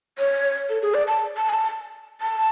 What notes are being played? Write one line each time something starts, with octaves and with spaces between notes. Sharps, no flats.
C#5
A4
G#4
D5
A5
A5
G#5
A5
A5